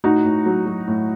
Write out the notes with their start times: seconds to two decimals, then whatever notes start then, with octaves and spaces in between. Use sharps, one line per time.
0.04 A2 D#4 F#4
0.25 A2
0.46 F#3
0.66 F#3
0.88 A2